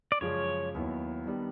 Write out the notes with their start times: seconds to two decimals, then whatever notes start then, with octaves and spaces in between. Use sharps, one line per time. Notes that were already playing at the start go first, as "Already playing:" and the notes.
0.12 D5
0.21 F#2 C#3 F3 G#3 C#4 C#5
0.74 D#2 D#3 F#3 B3 E4
1.26 D#3 G3 B3 D4